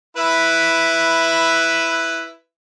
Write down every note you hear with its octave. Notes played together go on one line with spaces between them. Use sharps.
E4 B4 E5